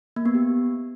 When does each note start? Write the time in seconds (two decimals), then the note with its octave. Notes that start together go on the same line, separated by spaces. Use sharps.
0.16 A#3
0.26 B3
0.35 G4